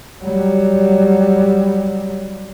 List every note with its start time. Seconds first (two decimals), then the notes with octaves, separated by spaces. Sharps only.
0.24 F#3 G3